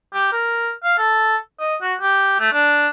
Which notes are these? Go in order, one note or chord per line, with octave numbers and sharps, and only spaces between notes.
G4
A#4
F5
A4
D#5
F#4
G4
A3
D4